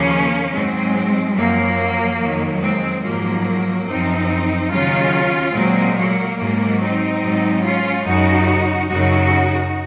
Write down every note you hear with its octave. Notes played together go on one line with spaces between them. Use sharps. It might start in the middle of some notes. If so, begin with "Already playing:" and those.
Already playing: D#2 C#3 F3 A#3 C#4
G#2 F#3 G#3 C4
F#2 F3 F#3 A#3
F2 D#3 F#3
G#3 C4
G#2 F3 F#3 A#3
F#2 F3 C4 D#4
D#2 C#3 F#3 C#4 F4
A#2 F#3 G#3 C4
F#3 A#3
G#2 F#3
C4 D#4
G#2 F#3
C#4 F4
F#2 C#3 F#3 D#4 F#4
F#2 C#3 F#3 D#4 F#4